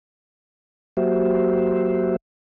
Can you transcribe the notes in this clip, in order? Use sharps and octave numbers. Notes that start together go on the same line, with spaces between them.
F#3 A#3 F#4 G4 C5 E5